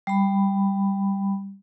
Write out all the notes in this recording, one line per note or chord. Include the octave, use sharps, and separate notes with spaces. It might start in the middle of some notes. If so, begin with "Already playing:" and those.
G3 B5